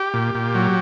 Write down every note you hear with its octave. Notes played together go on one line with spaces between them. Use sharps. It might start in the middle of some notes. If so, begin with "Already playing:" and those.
Already playing: G4
A#2
A#2
F#3